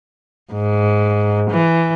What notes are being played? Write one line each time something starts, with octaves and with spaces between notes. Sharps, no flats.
G#2
E3